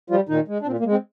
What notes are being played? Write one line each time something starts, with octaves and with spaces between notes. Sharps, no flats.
F3 G3 F4
A#2 D#3 D#4
G#3
D4
A#2 C4
A#3
G#3
C4